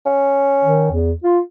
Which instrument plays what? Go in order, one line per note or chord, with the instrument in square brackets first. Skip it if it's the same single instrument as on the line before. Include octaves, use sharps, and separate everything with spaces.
[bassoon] C#4
[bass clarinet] D#3
E2
F4